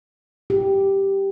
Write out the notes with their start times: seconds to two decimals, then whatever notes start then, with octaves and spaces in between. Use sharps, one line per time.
0.50 G4